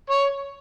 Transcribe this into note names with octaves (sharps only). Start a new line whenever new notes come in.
C#5